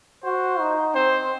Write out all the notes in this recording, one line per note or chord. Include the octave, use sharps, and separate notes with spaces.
F#4 C5
D#4
C4 C5